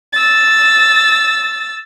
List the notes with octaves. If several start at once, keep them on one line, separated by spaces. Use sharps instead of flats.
E6 A6